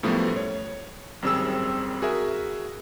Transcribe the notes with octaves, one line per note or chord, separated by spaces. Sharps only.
F#2 A2 F3 G3 A3 B3
C#5
G#1 F#2 G3 C4 G#4 E6
F#4 G#4 A#4 E5